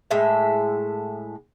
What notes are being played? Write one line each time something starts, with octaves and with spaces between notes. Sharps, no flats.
A2 G#3 E5